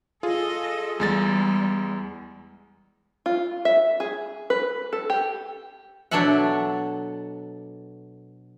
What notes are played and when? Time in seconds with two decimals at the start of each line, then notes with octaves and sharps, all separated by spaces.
0.23 F4 G#4 A4 D#5
1.00 E2 G3 G#3 A6
3.26 F4
3.65 E5
4.00 G#4
4.50 B4
4.93 A4
5.10 G4
6.11 B2 F#3 D4 A4 E5 F#5